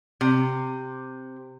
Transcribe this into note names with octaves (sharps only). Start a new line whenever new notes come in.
C3